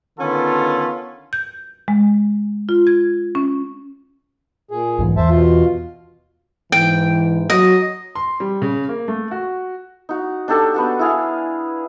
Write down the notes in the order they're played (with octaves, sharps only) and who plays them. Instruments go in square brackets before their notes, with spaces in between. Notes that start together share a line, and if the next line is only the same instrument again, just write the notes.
[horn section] D3 D#3 B3 C#4 F4 A4
[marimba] G6
G#3
F4
G#6
C#4
[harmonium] A#2 G#4
[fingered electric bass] B1 G#2 E3
[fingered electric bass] E2 E3 [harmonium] C5 E5 A5
[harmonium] B2 F4
[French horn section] G#2 E3 [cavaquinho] G5
[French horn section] F#3 [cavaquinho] D#5
[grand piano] C6
G3
C#3
A#3
A3
F#4
[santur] D#4 F#4
D4 D#4 G4 A4
B3 D4 F#4
E4 G#4 F5